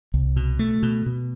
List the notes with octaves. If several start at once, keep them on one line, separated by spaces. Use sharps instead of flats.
C2
B2
A3
B2
B2